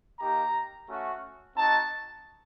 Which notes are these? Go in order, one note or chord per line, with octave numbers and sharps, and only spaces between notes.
A#3 D#4 G4 A#5
A3 C#4 F#4
C4 D#4 F#4 A5